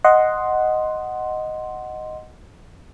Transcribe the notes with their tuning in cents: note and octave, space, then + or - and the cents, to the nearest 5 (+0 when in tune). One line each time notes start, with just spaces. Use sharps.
D#5 +0 F#5 +0 C6 +0